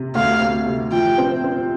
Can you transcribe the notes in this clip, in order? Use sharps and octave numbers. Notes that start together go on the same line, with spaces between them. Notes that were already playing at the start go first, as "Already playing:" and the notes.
Already playing: C3
D2 F5
D2
C3
F3 G5
C4
C4